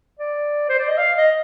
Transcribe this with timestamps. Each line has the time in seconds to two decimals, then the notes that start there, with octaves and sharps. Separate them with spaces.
0.19 D5
0.69 C5
0.79 D5
0.88 D#5
0.98 F5
1.17 D#5